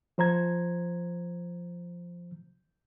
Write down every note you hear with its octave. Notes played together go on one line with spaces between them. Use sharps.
F3 C5 A#5 G#6